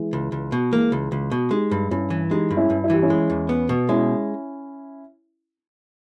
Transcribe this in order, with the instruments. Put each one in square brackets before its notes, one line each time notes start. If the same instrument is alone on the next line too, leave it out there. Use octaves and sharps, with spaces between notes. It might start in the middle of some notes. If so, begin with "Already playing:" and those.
Already playing: [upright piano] E3 G#3
[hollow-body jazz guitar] C#2
C#2
B2
[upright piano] E3 G#3 [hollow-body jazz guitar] A#3
[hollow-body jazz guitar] C#2
C#2
B2
[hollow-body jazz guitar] G#3 [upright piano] D#4 G4
[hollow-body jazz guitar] G2
[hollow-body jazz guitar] G2 [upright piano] C#4 E4
[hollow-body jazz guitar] E3
[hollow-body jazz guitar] G#3 [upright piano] D#4 G4
[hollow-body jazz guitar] G2
[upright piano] C#4 E4
[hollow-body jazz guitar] G2
[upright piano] E4
[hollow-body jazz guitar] E3 [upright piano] G4
[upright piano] C#4 E4
[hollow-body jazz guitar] G#3
E2
B3
B2
[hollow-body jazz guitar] G#3 [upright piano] C#4 E4